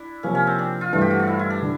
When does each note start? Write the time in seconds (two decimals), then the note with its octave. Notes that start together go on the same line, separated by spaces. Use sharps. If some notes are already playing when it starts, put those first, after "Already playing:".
Already playing: D4 E4
0.23 C3 F3 A#3 C#4
0.35 C#4
0.47 C4
0.59 D4
0.81 F4
0.92 G2 E3 A3 F4
1.01 G4
1.10 F#4
1.19 F4
1.27 E4
1.39 E4
1.50 D4
1.62 D3